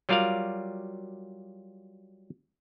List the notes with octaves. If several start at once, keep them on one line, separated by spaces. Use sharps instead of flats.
F#3 G3 F4 A#4 D5 F5